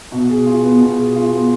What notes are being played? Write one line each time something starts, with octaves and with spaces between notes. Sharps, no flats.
B2
G#4
F4
B3
B2
G#4
F4
B3